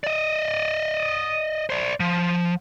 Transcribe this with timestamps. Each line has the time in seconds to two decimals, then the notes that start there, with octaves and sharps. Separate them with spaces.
0.04 D5 D#5
1.70 C5 D5
2.00 F3